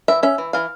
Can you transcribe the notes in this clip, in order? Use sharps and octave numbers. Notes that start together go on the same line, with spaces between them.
E3 E5
C#4 E5
E3
E3 F5